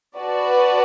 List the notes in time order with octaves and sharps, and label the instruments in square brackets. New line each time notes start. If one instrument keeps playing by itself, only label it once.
[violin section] F#4 B4 D5 A5